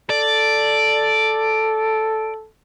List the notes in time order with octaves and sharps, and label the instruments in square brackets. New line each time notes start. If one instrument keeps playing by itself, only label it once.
[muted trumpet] A4 [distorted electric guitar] D5